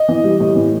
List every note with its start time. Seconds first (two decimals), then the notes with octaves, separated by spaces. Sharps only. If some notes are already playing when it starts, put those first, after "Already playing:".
Already playing: D#5
0.09 E3
0.24 G3
0.40 A2
0.56 E3